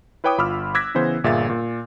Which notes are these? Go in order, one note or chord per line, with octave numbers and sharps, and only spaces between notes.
E4 B4 C#5 G5 D6 D#6
G1 F4 B5 D6 E6 F6
D6 E6 F#6 G#6 A#6 B6
C#3 E3 B3 C5
G1 A#2 G#4 E5 F5 A6
A#2